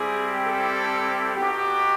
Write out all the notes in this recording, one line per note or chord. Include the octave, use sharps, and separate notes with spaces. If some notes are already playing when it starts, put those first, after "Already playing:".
Already playing: G3 C4 E4 G4 G#4
A4
B3 D#4 F#4 G4